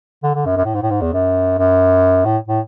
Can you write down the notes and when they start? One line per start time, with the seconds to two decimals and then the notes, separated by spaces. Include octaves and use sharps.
0.23 D3
0.34 D3
0.45 F#2
0.57 F#2
0.65 A2
0.74 G#2
0.82 A2
0.90 G#2
1.01 E2
1.13 F#2
1.58 F#2
2.25 A2
2.48 A2